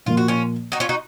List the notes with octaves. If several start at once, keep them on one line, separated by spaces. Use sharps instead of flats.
A#2 F3 A#3 F4
F#4
C#4 F4
D#4 F#4
C#4 F4
D#4 F#4